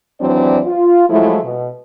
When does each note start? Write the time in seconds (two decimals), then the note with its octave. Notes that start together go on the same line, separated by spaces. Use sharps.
0.21 D#2 E3 F#3 C4 D4 D5
0.66 F4
1.10 F3 F#3 G#3 A3 E4
1.44 B2